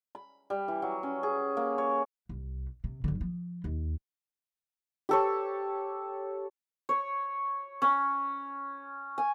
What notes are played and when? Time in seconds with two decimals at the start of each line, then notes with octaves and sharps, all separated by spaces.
0.15 B5
0.50 G3
0.68 E3
0.82 F#3
1.03 C#4
1.23 G#4
1.57 A#3
1.78 C#5
2.29 C2
2.84 C3
3.04 F#1 D3
3.21 F3
3.64 D#2
5.09 G4 A4 C#5
6.89 C#5
7.82 C#4
9.18 G#5